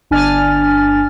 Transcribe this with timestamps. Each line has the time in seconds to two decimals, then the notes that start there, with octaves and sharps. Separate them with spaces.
0.11 G1 D4 G#5 F6 A6